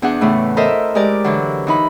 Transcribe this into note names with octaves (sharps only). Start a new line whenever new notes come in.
E2 D4 G#4 F#5
A2 C#3 E3 A3
E4 A4 A#4 C5 D#5 E5
G#3 G4 A#4 D5
D3 E3 F#3
E3 D#4 B5